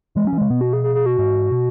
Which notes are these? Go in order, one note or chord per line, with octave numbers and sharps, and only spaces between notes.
E3 G#3
F#3 C#4
E3
C#3 G#3
B2 B3
F#4
G#4
G#4
G#4
F#4
G#2
B2